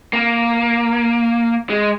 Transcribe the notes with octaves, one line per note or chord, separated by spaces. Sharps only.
A#3
G#3